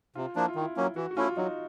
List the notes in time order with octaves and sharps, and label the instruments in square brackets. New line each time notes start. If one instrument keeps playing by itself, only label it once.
[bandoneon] C3 [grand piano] F4
[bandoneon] F3 A#3 D4 [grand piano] E4
[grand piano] F4
[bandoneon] D#3
[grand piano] E4
[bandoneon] F#3 A#3 C#4
[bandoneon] E3 [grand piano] F#4
[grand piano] F#4
[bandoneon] A3 C#4 E4 [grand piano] F4
[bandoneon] F#3 [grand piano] D#4